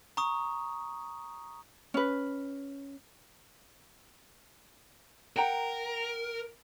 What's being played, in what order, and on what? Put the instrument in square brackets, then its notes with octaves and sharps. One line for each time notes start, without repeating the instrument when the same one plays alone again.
[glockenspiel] A#5 C#6 D#6
[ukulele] C#4 B4
[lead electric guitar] A#4 [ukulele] F#5 G5 A#5